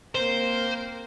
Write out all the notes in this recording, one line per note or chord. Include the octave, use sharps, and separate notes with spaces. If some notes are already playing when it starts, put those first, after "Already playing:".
A#3 C4 A#4 C5